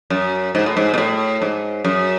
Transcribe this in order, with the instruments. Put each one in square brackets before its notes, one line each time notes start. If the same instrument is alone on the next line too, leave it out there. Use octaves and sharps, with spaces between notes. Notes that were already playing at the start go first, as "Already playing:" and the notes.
[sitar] F#2
G#2
A2
G#2
B2
A2
G#2
F#2